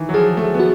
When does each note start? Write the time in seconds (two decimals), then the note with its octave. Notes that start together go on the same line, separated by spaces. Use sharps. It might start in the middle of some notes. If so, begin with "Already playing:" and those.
Already playing: D#3 E3
0.09 F#3
0.14 F3 G#4
0.37 A3
0.55 B3
0.60 F#4